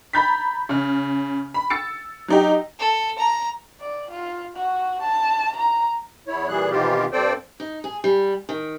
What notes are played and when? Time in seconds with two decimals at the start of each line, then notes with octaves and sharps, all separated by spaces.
0.13 A#5 B5 G6 A6 B6
0.69 C#3 F6
1.54 B5
1.70 E6 A6 C#7
2.28 F#3 D#4 G4
2.79 A4
3.18 A#5
3.80 D5
4.11 F4
4.56 F#4
5.02 A5
5.57 A#5
6.27 E2 E4 C#5
6.48 A#2 E3 G3 G#4 F#6
6.70 B2 D#3 E3 C4 F4 G4
7.12 G2 C4 A4 C5 D5 G5
7.60 D#4
7.84 G#4
8.04 G3
8.49 D#3